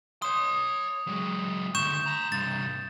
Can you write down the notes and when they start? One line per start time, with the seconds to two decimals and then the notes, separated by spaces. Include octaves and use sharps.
0.22 C#5 C6 D#6
1.07 F#3 G#3
1.75 D2 G#2 C#6 G6 E7
2.06 G#5 A#5
2.32 C2 G2 A6